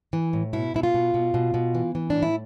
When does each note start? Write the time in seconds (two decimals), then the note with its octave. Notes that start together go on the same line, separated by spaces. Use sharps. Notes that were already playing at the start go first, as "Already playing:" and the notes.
0.13 E3
0.33 A2
0.53 B2 E4
0.74 B2 E4
0.83 F4
0.94 B2
1.14 B2
1.34 B2
1.54 B2
1.75 E3
1.95 E3
2.10 D4
2.15 A2
2.22 E4